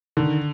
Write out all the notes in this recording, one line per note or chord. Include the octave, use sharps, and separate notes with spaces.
D3 D#3